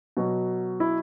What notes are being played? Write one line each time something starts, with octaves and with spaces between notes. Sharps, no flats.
B2 F#3
E4